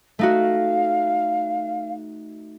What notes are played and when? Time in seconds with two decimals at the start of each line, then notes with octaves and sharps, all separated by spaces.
0.19 A3 D#4 F#4 F5